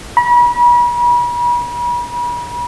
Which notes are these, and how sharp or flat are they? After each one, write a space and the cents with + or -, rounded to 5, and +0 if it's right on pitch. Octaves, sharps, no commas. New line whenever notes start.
B5 -40